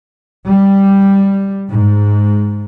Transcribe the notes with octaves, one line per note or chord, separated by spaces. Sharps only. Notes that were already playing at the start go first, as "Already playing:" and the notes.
G3
G#2